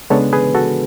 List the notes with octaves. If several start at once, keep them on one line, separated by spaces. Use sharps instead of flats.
C#3 G#3 B3 D4 A4 C#5
G#4 B4
F#4 A4